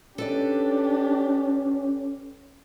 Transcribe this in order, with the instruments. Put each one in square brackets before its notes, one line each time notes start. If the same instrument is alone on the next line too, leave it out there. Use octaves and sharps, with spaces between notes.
[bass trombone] C#4 [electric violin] D4 G4 [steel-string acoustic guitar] A4 B4 D5